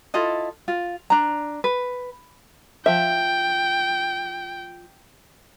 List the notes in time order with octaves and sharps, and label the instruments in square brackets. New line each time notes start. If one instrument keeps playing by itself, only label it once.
[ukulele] E4 F4 A4 D#5
F4
D4 A#5
B4
[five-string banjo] F3 E5 [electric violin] G5